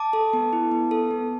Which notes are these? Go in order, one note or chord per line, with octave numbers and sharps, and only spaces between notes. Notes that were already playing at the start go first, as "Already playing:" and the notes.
Already playing: A5 D6
A4
B3
E4
B3
A4
B3